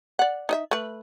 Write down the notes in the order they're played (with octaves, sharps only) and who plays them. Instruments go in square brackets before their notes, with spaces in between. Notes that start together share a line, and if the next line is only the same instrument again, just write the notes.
[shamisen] D5 F#5
D#4 D#5 E5
A3 B4